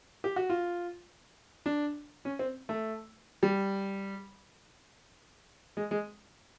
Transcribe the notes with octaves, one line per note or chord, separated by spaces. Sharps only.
G4
F#4
F4
D4
C#4
C4
A3
G3
G#3
G#3